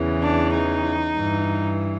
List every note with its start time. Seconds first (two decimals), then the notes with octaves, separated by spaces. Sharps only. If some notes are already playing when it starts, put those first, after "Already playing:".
Already playing: E2 C#3 E3
0.21 D4
0.52 D#4
1.16 G2 E3